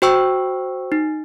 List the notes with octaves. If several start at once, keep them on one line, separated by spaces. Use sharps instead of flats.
F#4 C5 G5 C#6 E6
D#4